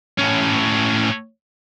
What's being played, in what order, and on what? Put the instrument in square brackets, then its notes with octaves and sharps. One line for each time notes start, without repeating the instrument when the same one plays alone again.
[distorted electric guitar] A2 C#4